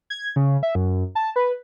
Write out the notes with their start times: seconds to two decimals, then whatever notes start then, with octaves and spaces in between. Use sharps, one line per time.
0.10 G#6
0.36 C#3
0.63 E5
0.75 F#2
1.15 A5
1.36 B4